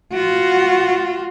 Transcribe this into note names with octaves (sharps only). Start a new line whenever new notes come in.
F4 F#4